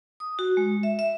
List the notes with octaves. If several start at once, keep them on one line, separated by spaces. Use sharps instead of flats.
D#6
F#4
G#3
E5
E5